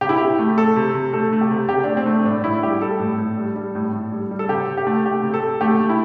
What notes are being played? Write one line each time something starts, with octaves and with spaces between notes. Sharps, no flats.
C3 G4
E4
C3 G4
A3
A3 A4
C3
C3
A3 A4
A3
G4
C3
C3 G4
A3 D4
C4
A3
A2 D4
A2 E4
G3 G4
G3 A4
A2
A2
G3
G3
A2
A2
G3
G3
A4
C3 G4
C3
G4
A3
A3 G4
C3
A4
C3
A3 G4
A3
E4